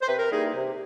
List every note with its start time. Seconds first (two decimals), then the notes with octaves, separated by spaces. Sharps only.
0.02 C5
0.08 C3 B4
0.18 A#4
0.30 E3 G3 A#3 D#4 G#4
0.54 C3